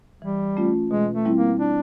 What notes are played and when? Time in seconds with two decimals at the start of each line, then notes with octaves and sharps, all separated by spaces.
0.22 E3 G3
0.57 A3 C#4 F4
0.90 B2 G#3
1.14 A3
1.25 G3 C4 E4
1.36 A#3
1.60 D4